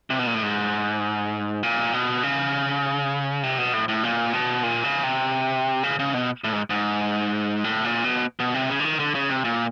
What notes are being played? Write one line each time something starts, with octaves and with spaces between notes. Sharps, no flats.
C3
B2
A#2
A2
G#2
A#2
B2
C#3
C3
B2
A2
A2
A#2
B2
A#2
C#3
C3
C#3
C#3
B2
A2
G#2
G#2
A2
A#2
B2
B2
C3
C#3
D3
D#3
D3
C#3
C3
A#2